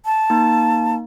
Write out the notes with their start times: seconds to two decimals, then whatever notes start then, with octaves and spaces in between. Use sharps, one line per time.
0.05 A5
0.30 A#3 D#4